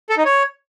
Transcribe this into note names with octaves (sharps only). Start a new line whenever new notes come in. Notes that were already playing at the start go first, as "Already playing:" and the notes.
A4
D#4
C#5